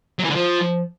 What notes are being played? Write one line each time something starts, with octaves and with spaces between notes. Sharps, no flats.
F#3
E3
D3
F3